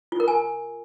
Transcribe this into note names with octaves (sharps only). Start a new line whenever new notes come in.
F4
A#4
G#5